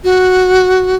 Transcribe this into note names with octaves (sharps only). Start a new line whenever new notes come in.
F#4